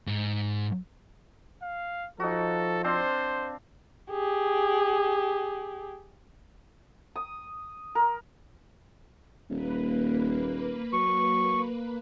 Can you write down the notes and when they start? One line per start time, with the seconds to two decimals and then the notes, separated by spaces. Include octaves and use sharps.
0.07 G#2
1.62 F5
2.20 F3 D#4 F#4 A4
2.84 C4 D4 C5 F5
4.11 G4 G#4
7.16 D#6
7.95 A#4
9.50 D#1 A#3 B4
10.93 F#3 C#6